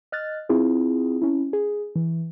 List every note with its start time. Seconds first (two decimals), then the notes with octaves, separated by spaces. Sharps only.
0.12 D#5 F6 F#6 A6
0.49 C4 E4 F4 G#4
1.22 C#4 E4
1.53 G#4
1.95 E3